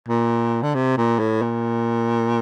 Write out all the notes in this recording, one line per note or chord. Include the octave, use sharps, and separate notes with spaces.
A#2
D3
C3
A#2
A2
A#2